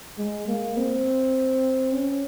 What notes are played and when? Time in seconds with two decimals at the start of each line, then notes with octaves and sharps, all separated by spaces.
0.18 G#3
0.48 A#3
0.77 C4
1.93 C#4